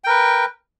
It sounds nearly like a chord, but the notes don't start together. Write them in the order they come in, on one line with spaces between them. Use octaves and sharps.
G5 A#4 B4